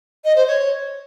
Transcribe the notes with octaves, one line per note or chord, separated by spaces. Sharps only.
D#5
C5
C#5